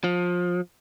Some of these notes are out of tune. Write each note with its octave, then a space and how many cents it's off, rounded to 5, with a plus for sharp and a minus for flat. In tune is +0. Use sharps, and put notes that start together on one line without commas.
F3 +25